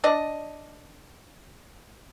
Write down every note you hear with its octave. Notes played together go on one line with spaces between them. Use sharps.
D4 D5 D#5